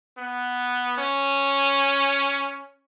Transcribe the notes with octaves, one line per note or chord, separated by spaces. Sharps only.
B3
C#4